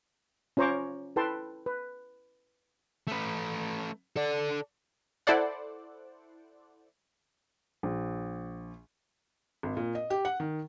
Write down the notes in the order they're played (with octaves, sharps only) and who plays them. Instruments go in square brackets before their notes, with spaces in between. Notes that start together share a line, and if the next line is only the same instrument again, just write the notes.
[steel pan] C#4 F4 C5 A#5 C#6 D6
E4 A4 B4 G5 A5 C6
B4
[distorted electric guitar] A3 B4
A4 D5
[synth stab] E4 A4 C5 D5 F#5
[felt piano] A#1
G#1
A#2
D#5
G4
F#5
D#3